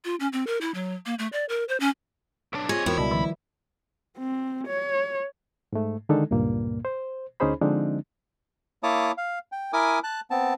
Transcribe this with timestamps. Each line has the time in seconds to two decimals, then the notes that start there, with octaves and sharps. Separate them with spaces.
0.05 F4
0.20 C#4
0.32 C4
0.47 A#4
0.61 E4
0.74 F#3
1.06 A#3
1.19 A3
1.32 D5
1.49 A#4
1.68 C5
1.80 C#4
2.53 B1 D4 C#5
2.69 C4 F4 G#4 C#5 D#5
2.86 E2 E4 F#4 A#4 G5
2.98 C#2 B2 G3 D5 A5 B5
3.11 D#3 F3 G3
4.18 C4
4.67 C#5
5.73 G#2 A3
6.09 D3 D#3 G#3 D4 D#4 A4
6.31 C#2 G2 A#2 A#3
6.85 C5
7.40 D2 C#4 D#4 G#4 C5 B5
7.61 D3 F3 G#3 C4 D4 D#4
8.83 A#3 E4 C#5 A5 D6 D#6
9.18 F5
9.52 G5
9.73 E4 A#4 G#5 D6 D#6
10.04 A5 F#6
10.31 B3 C4 A5